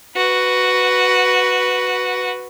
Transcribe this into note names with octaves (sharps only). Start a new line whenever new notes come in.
F#4 B4